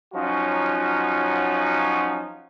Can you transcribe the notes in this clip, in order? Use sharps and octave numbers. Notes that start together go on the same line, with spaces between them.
F3 F#3 C#4 D#4 F4 F#4